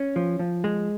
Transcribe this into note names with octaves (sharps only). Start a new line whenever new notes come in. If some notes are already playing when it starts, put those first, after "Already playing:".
Already playing: C#4
F3
F3
G#3